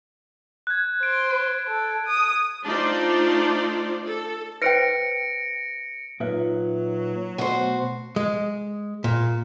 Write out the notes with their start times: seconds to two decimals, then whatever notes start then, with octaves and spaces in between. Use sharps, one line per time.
0.67 F#6 G#6
1.03 C5 D7
1.68 A4
2.06 D#6
2.66 A3 D4 D#4 F4 C5 D5
4.04 A4
4.62 B4 C5 G5 A#6 C#7 D7
6.20 A#2 F#3 D#4 F4 B4 E5
7.38 B2 A3 B3 F#4 C5
8.16 G#3
9.04 A#2